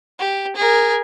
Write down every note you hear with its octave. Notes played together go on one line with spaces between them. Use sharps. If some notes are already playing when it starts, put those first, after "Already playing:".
G4
G#4 A#4